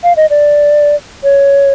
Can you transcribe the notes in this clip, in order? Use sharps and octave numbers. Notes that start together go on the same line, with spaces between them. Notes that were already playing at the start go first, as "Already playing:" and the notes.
F5
D#5
D5
C#5